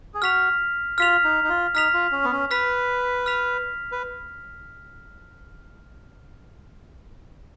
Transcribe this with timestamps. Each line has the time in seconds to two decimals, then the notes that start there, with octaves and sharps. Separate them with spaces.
0.14 G#4
0.22 F#4 F6 B6 F7
0.98 F4 F6 B6 F7
1.24 D#4
1.44 D#4
1.49 F4
1.74 D#4 F6 B6 F7
1.94 F4
2.12 C#4
2.24 B3
2.32 C#4
2.51 B4 F6 B6 F7
3.26 F6 B6 F7
3.92 B4